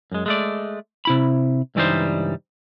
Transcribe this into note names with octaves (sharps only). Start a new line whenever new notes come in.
F#2 G#3
G#3 A3 D5
C3 E4 B5
C#2 G2 E3 G3 D#4 C5